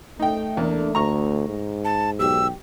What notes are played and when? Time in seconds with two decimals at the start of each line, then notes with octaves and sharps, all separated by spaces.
0.20 A3 D#4 G5
0.57 E2 A#3 D4
0.95 D2 A#5 C#6
1.48 G#2
1.85 A5
2.19 B1 G4 E6